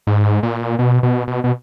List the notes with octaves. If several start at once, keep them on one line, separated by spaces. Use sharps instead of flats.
G#2
A#2
B2
B2
B2
B2